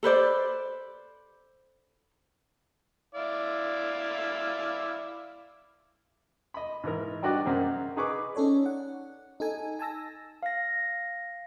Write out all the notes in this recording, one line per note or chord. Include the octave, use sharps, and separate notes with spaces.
A4 B4 C5 D5
E4 D5 F5
D#5 B5
G#2 E3 A#4
G3 D4 F#4 G4 D5 D#5
F#2 A#3 C4 G#4
D#4 G#4 B4 C#6 D6
C#4 D#4 A4 C#5 D5
F#5
D#4 A4 G#5
G#5 A5 E6 A#6
F5 A#6